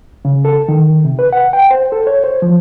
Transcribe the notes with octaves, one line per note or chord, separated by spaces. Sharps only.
C#3
A4
D#3
C3
B4
F#5
G5
C5
A4
C#5
C5
F3